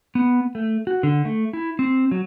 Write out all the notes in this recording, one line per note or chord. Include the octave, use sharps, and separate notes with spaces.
B3
A3
F#4
D3
A3
E4
C4
F#3